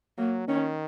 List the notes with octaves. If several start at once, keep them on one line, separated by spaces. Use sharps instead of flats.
F#3 A#3
D#3 C#4